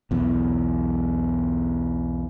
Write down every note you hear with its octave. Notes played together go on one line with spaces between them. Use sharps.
B1 E2